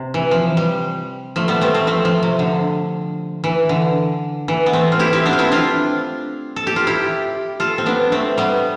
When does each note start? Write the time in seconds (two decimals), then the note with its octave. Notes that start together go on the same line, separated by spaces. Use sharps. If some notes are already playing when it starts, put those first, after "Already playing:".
Already playing: C3
0.14 E3
0.31 F3
0.57 G3
1.36 F3 A3
1.48 G3 B3
1.61 A3 C4
1.74 A3 C4
1.87 F3 A3
2.05 F3
2.23 C3
2.39 D3
3.44 E3
3.69 D3
4.48 E3
4.66 B3
4.73 A3 C4
4.92 F4
4.99 E4 G4
5.13 C4 E4
5.25 B3 D4
5.33 F4
5.39 C4 E4
5.52 D4 F4
6.56 A4
6.67 G4
6.76 F4
6.87 E4 G4
7.60 F4 A4
7.78 C4
7.86 B3 D4
8.12 A3 C4
8.38 G3 B3